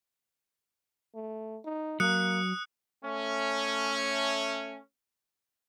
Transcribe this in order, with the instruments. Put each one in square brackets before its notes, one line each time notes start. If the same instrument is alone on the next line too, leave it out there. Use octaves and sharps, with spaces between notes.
[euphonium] A3
D#4
[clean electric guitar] F#3 [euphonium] A#3 [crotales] D#6 F#6 C#7
[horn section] A3 C#4